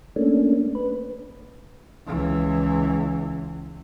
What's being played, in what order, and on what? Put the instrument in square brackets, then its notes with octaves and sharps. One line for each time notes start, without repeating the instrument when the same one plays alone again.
[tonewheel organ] A3 A#3 C#4 D4
B4
[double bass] C#2 E3